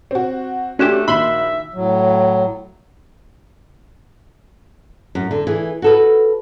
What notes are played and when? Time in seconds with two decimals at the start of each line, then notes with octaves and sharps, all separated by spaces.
0.11 C4 F#4
0.79 A3 C#4 D4 F#4 G4 F#6 E7
1.08 A#1 D#3 E5 B5 C6
1.74 A2 F#3
5.15 F#2
5.31 D3
5.47 E3 G#4
5.82 F#4 A4 B4